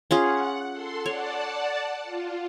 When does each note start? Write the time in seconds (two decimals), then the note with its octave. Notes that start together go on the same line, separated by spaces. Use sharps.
0.11 C#4 F4 G#4 F#5
0.72 A4 C6
1.06 C#5 D5 F#5 A5
2.04 F4